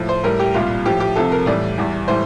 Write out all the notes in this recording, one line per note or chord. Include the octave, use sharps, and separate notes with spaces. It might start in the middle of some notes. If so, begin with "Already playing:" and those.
Already playing: A2 F3
C5
A2 G3 A#4
G4
C2 A#2 G3 F4
A2 F3 G4
G4
C2 C3 F3 A4
A#4
A2 E3 G3 D5
E2 E3 G3
A2 E3 G3 C5